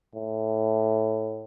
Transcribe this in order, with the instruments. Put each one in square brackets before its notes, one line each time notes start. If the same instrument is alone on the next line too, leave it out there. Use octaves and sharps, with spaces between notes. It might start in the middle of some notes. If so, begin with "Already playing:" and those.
[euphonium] A2